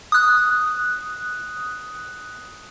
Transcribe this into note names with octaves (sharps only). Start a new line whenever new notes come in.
D#6 F#6